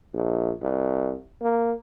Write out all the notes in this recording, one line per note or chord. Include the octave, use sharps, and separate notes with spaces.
A#1
C2
A#3